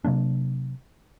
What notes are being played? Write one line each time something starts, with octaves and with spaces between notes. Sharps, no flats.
C3 F#3 A#3 D4